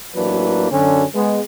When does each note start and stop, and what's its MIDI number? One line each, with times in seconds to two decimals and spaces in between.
0.16 0.71 33
0.16 0.71 52
0.16 0.71 54
0.16 0.71 58
0.16 0.71 62
0.16 0.71 71
0.71 1.04 42
0.71 1.04 50
0.71 1.04 61
1.15 1.41 56
1.15 1.41 59